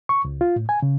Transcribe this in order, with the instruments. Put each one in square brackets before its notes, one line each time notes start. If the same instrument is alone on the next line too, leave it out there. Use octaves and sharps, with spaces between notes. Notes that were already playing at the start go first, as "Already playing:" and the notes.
[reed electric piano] C#6
C#2
F4
A2
G#5
C#3